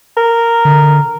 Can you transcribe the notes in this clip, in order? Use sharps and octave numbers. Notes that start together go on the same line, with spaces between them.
A#4
D3